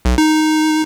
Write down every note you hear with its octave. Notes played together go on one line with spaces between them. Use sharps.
B1
D#4